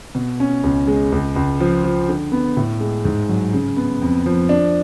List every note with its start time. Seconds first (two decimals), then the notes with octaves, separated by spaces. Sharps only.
0.15 B2
0.40 C#4
0.64 C#2
0.87 G#3
1.12 C#2
1.36 C#2
1.60 F3
1.84 F3
2.09 D3
2.32 B3
2.57 A2
2.80 G#3
3.05 G#2
3.29 F#3
3.53 C#3
3.77 B3
4.01 F2
4.26 F3
4.49 D4